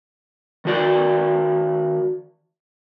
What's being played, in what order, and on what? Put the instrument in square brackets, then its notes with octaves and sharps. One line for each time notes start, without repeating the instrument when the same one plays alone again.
[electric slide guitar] D#3 F#4 D5